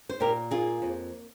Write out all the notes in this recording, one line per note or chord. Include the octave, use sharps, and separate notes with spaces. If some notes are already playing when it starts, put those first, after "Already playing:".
C5
A#2 G4 A#4
A#3 F4 G#4
F2